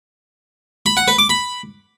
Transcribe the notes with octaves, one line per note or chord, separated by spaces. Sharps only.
B5
F#5
B4
D6
B5